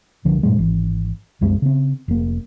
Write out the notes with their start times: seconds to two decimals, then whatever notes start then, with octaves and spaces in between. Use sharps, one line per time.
0.25 C2 D3 F3
0.43 G2 A#2 F#3 G#3
0.58 G#1 E3
1.41 C2 F#2 G#3 C4
1.62 C#3 C4
2.08 F1 A#3